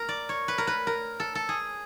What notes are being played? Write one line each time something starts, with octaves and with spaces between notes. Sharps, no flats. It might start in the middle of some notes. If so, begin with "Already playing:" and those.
Already playing: A#4
D5
C#5
B4
A#4
B4
A#4
A4
A4
G#4